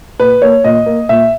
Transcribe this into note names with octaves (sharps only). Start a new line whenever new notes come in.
A#2 B4
A#3 C#5
A#2 D#5
A#3
A#2 E5